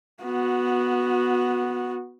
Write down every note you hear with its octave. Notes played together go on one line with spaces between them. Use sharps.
B3 F#4